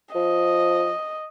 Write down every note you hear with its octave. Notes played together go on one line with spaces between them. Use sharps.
F3 D#5